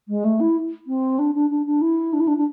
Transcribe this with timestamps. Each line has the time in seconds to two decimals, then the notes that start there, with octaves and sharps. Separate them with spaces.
0.08 G#3
0.24 A3
0.40 E4
0.87 C4
1.19 D4
1.34 D4
1.50 D4
1.66 D4
1.81 E4
2.13 D4
2.20 E4
2.27 D4
2.37 D4